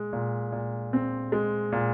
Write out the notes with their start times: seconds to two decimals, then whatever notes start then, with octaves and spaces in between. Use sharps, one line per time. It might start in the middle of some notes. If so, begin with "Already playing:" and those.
Already playing: A#2 G#3
0.13 A#2
0.52 A#2
0.93 C4
1.32 G#3
1.72 A#2